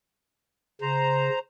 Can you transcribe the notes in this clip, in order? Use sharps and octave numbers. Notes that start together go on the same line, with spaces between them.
C#3 C5 A#5